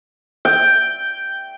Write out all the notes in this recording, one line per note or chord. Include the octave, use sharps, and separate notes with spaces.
G5